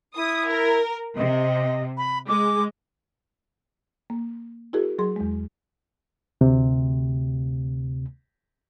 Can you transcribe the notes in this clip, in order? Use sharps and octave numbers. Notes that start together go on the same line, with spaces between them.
E4 D#6
A#4
C3 D#5
B5
G#3 D6
A#3
E4 F#4 G#4 A#4
F#3 G#4 C6
E2 G#3
D2 C3